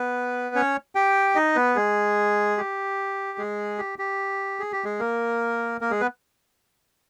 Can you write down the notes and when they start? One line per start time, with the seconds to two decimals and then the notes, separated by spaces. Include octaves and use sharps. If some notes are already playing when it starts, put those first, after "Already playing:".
Already playing: B3 B4
0.55 C#4 C#5
0.95 G4 G5
1.35 D#4 D#5
1.56 B3 B4
1.76 G#3 G#4
2.58 G4
3.38 G#3 G#4
3.78 G4
3.99 G4
4.60 G#4
4.72 G4
4.84 G#3 G#4
4.99 A#3 A#4
5.81 A#3 A#4
5.91 G#3 G#4
6.01 B3 B4